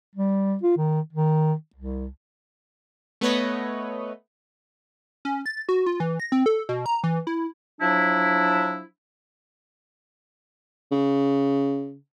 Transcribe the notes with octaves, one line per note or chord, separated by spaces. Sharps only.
G3
F4
D#3
D#3
C2
A3 B3 B4 C#5 D#5
C#4
A6
F#4
F4
E3
A#6
C4
A4
B2
A#5
E3
E4
F3 F#3 D4 E4
C#3